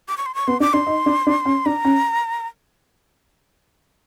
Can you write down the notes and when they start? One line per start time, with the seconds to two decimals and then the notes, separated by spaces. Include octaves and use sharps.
0.09 D6
0.18 C#6
0.26 C6
0.35 C#6
0.48 B3 C6
0.60 D4 D6
0.73 D4 C6
0.87 D#4
1.06 D4
1.27 D4
1.45 C#4
1.66 D4 A#5
1.85 C#4